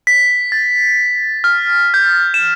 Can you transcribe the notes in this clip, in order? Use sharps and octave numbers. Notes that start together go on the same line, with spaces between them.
B6
A6
F6
G6
E7